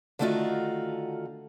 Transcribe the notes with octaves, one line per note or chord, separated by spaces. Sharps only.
D3 D#3 A3 D#4 F4 F#4